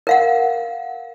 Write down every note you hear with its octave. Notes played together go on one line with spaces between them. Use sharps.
A#4 F5 F#5